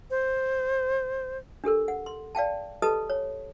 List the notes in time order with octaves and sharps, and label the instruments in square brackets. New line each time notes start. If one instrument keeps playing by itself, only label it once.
[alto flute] C5
[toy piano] D4 G4 A4 A#4
F#5
C6
D5 F5 G5 A5
G4 A4 B4 D#5 A5 D#6
C#5